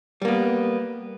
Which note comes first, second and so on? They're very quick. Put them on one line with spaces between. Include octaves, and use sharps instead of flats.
G3 A#3 B3